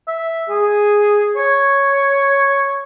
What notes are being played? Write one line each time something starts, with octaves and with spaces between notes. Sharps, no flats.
E5
G#4
C#5